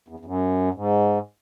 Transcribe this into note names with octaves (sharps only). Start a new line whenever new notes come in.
E2
E2
F#2
G#2